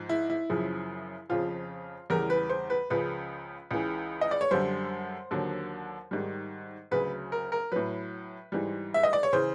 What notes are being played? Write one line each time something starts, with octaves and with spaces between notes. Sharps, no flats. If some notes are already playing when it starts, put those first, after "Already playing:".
Already playing: G#2 F3
E4
E4
F#2 C#3 F3
F2 C#3 F3 F4
E2 C#3 E3 G3 A#4
B4
C5
B4
C#2 C#3 F3 B4
C#2 C#3 E3
D#5
D5
C#5
F#2 D3 G3 C5
D#2 D3 F#3
G#2 D#3 G3
D2 C#3 F#3 B4
A#4
A#4
A2 F#3 B4
G#2 E3 G3
E5
D#5
D5
C#5
C#3 E3 C5